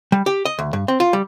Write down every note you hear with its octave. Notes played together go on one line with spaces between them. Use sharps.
G3
G4
D#5
D2
G2
C4
F4
G3